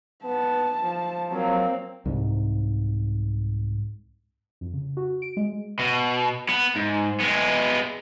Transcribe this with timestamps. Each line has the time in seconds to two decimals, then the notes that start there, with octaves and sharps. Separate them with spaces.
0.24 B3 A5
0.83 F3
1.31 F#3 A#3 C4
2.05 C2 G#2
4.61 F2
4.73 C#3
4.97 F#4
5.22 D7
5.37 G#3
5.79 B2
6.49 B3
6.76 G#2
7.20 G#3 B3